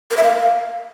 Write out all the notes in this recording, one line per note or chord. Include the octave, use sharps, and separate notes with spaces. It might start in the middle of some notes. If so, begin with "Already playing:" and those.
A#4
E5
F5